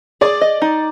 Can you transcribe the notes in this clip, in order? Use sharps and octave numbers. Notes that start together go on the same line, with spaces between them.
G#4 D5
D#5
D#4